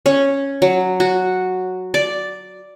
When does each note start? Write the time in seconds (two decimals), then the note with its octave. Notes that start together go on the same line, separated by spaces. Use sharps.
0.06 C#4
0.62 F#3
1.00 F#4
1.94 D5